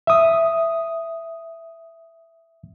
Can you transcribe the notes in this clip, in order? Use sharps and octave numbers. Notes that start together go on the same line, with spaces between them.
E5 D#6